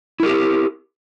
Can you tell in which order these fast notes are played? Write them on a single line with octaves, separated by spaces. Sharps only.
E4 A#4 G4